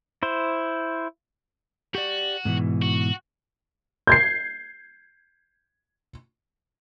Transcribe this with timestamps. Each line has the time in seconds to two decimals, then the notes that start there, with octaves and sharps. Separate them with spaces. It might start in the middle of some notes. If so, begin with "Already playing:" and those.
0.23 E4 C5
1.95 F#4 G4 D5
2.45 G#2 B2 E3
2.82 F#4
4.07 G6 G#6 C7